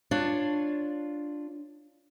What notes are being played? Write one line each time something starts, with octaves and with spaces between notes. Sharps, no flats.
D4 F4 C#5